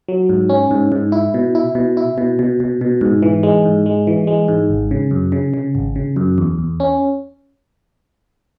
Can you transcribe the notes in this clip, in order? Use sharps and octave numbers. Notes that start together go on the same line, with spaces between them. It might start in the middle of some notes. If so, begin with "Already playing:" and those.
F#3
G#2
C#4
G#2
G#2
E4
B2
E4
B2
E4
B2
B2
B2
B2
G#2
E3
G#3
G#2
G#3
E3
G#3
G#2
G#1
C#3
F#2
C#3
C#3
G#1
C#3
F#2
E2
E2
C#4